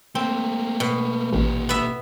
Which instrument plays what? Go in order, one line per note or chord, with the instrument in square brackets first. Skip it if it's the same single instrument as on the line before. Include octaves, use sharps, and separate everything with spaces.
[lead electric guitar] A3 A#3 [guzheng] C4
[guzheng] B2
[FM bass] A1 [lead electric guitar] A#2 G4
[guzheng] B3 E5 B5